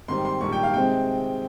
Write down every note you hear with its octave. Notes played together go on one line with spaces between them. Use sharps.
G#2 D#3 G3 C4 C6
C6
A#1 G#2 D#3 G3 A#3 C#6
G5
F5
C3 D#3 G#3 C4 G5